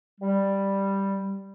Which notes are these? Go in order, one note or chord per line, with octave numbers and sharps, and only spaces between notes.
G3